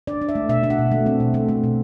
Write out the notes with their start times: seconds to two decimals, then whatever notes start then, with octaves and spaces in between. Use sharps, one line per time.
0.07 D4 D5
0.22 D4
0.29 E5
0.35 A3
0.49 B2 E5
0.63 D4
0.70 F#5
0.79 B2
0.91 A3
1.06 C4
1.20 B2
1.34 A3
1.49 A3
1.64 B2